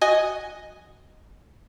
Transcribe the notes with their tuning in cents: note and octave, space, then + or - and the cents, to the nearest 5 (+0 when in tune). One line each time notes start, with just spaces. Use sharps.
F#4 +0 D#5 +0 G#5 +0